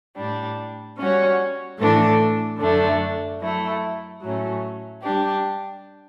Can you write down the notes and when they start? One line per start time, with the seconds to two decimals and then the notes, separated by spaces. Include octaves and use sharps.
0.16 A2 G3 D4
0.97 G3 C#4 F#4 C#5
1.78 A2 E3 A3 D4 A4
2.60 F#2 D3 A3 D4
3.40 F#3 A3 E4
4.22 A2 F#3 A3 C#4
5.02 G3 D4 G4